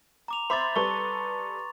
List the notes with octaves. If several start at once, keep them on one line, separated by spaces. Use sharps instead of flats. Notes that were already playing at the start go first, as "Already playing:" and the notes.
A#5 D6 F7
C5 E5 B5 C6 D6 A6
G3 A4 B4 C#6